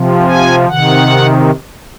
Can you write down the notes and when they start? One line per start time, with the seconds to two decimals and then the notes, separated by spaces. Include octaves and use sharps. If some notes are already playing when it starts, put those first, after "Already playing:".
Already playing: C3 F3
0.27 G#5
0.68 C3 D#3 F#5